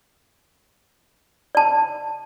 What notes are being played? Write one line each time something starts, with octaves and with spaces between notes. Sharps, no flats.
D5 A5